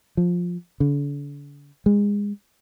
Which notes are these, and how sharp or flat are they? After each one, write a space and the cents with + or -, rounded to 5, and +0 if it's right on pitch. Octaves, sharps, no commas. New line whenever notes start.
F3 +10
D3 -40
G#3 -25